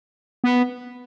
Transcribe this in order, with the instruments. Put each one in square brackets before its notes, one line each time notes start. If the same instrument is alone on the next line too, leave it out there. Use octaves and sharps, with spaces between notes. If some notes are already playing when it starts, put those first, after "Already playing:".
[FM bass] B3